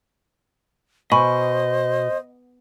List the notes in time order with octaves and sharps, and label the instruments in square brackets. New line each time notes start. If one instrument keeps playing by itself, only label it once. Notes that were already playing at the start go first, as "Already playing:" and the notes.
[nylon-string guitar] B2 [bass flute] C5 [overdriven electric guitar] D#5 [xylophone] G#5 B5 C#6